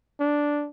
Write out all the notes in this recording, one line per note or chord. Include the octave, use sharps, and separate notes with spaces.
D4